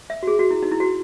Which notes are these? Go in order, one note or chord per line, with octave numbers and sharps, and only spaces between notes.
E5
F#4
G#4
F#4
E4
D#4
E4
F#4